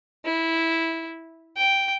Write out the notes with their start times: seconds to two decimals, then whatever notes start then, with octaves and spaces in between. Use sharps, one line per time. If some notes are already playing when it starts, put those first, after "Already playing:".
0.25 E4
1.57 G5